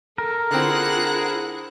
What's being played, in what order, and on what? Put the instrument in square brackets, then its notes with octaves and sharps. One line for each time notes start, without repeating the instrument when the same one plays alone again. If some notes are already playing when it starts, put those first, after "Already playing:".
[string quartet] A4 [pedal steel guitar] A#4
[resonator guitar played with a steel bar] D3 C4 [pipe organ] E4 G#4 [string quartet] F4 F#5 F#6